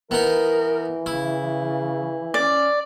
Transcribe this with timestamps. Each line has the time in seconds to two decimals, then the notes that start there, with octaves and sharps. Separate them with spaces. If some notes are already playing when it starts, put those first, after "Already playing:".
0.11 E3 B3 D#4 A#4
1.06 C#3 E4
2.34 C#4 D5